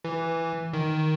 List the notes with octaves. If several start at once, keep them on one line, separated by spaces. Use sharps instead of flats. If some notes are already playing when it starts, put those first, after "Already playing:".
E3
D#3